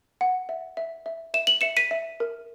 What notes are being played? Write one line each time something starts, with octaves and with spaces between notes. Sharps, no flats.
F#5
E5
E5
E5
E5 E7
F#7
E5 C#7 E7
B6 D#7
E5
A#4